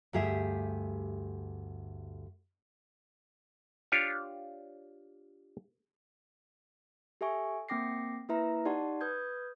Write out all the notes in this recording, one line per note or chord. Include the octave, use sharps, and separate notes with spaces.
D2 G2 G4 G#4 E5
D4 F4 G4 C#5
G4 A4 E5 G#5 C#6
A#3 C4 G5 D6 A#6 C7
A#3 E4 B4 E5 A#5
D#4 G4 D5 F#5 A5 C6
B4 D#6 G6 G#6